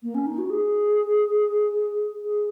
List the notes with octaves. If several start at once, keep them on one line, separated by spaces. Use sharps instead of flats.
A#3
C#4
D#4
F#4
G#4
G#4